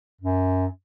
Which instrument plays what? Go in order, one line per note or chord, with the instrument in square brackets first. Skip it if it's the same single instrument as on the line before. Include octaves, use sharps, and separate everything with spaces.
[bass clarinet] F#2